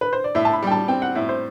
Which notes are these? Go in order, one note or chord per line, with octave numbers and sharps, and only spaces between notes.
B4
C5
D5
A2 E5
A5
B5
G3 G5
A5
C4 G5
F#5
A2 E5
C5